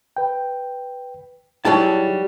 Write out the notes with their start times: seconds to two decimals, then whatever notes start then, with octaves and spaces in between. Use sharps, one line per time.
0.17 B4 G5
1.65 F#3 G3 D#4 E4 G#4 A5